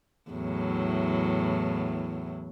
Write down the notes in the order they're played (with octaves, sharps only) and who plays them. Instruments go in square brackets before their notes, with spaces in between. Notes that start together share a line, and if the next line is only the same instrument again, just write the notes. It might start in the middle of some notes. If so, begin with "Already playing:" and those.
[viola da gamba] E2 A2 F#3